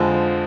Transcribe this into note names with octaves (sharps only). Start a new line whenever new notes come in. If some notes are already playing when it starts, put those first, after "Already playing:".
Already playing: F2 D3 F3 G#3